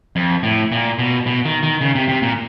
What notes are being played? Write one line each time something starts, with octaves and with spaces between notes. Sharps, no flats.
F2
A2
A#2
B2
B2
D#3
D#3
C#3
C3
C3
A#2